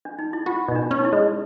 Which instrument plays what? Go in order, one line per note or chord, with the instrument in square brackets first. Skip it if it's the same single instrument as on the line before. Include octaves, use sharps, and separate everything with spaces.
[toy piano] D4
D#4
E4
[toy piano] F4 [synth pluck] F#4
[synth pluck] B2 [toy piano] D#4
[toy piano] D4
[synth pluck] C#4
[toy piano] D#4
E4
[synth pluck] G#3